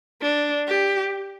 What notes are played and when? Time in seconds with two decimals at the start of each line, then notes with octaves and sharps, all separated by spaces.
0.22 D4
0.68 G4